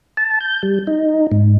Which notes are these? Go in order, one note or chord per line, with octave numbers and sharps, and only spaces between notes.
A5
G6
G3
D#4
G#2